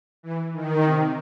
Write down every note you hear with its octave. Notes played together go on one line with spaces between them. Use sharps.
E3
D#3
C3